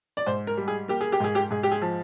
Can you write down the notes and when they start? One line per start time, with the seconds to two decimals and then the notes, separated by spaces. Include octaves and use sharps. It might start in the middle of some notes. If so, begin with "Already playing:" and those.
0.17 D5
0.26 G#2 C5
0.47 A#4
0.57 G3
0.68 G#4
0.88 A#3 G4
1.01 G#4
1.12 G4
1.20 G#2 G#4
1.35 G4
1.51 G#2 G#4
1.63 G4
1.72 G#4
1.82 F3